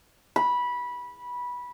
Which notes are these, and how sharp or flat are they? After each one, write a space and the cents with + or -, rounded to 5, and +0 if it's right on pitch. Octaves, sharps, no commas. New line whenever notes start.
B5 -15